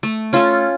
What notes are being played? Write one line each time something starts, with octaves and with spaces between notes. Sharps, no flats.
A3
C#4 F4 A4